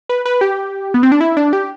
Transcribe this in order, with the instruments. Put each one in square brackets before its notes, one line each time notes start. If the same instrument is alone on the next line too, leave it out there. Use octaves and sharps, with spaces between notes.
[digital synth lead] B4
B4
G4
B3
C4
D4
E4
D4
G4